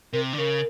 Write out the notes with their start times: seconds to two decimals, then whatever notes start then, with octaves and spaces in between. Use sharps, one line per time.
0.13 C3 A#4
0.33 D3
0.38 C#3 A#4